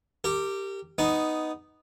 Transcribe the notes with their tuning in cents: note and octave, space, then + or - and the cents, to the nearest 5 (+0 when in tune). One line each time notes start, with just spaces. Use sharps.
G4 +0 A#4 -35
B3 +5 D#4 +0